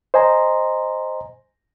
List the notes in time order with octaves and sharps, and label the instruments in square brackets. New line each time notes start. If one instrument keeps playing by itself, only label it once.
[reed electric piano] C5 D#5 G#5 A#5 C6